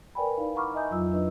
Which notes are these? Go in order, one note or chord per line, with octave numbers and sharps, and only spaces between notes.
A#4 B4 D5 G5 G#5 B5
D#4 E4 D5 F5
F#5 A#5 B5 C#6 D6 F6
D#5 E5 G#5 A#5 D#6 G6
F2 F#3 F4 E6
D4 E4 B4 D#5